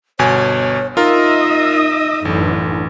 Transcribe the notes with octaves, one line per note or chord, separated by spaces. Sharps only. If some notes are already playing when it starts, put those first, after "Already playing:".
G1 B2 C#5 G#5
D#4 F4 A#4 D#5 E5 D#6
A1 F#2 D3 E3